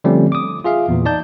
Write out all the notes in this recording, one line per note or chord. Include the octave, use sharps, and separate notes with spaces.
D3 F3 G3 A3 C4 C#4
D6 D#6
F4 G#4 E5 F5
E2 A#2 E3
D#4 D5 A5 G6